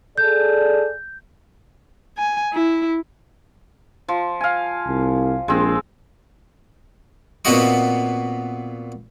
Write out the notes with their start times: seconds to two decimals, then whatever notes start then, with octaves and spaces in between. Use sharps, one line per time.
0.18 G#4 A4 D5 G6
2.18 G#5
2.53 E4
4.08 F3
4.41 F5 G#5
4.86 C2
5.48 A#1 G#3 C4
7.45 A#2 B3 C4 F#4 D#5 C#6